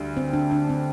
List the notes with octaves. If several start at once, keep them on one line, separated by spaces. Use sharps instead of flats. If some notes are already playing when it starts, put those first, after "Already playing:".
Already playing: D2 D3 G3
C4
D4
D4
C4